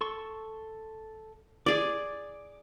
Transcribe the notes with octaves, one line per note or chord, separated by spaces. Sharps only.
A4 C6 C#6
G#4 D5 D6